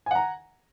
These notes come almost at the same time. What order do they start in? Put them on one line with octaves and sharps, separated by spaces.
G#5 F#5 A#5